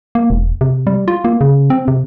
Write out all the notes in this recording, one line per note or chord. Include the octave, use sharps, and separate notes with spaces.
A#3
E1
C3
G3
F4
A#3
C#3
C4
C3